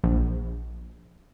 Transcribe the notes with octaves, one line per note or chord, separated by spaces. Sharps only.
A#1